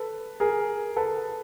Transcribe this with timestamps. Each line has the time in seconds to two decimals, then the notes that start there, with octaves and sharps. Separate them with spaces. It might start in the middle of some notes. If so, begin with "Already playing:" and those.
Already playing: A4 B4
0.40 G#4 A#4
0.96 A4 B4